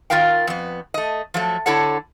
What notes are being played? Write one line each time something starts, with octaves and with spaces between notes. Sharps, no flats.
D#3 G3 F4 A#4 F5 G5
F2 B3
A3 D#5
F3 F#3 A3
D3 E4 A4 C#5 F#5